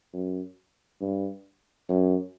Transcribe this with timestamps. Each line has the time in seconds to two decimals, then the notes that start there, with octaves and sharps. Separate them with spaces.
0.14 F#2
1.01 G2
1.89 F#2